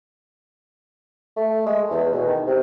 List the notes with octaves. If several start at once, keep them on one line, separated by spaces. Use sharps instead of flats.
A3
G#3
E2
B2
D#3
C3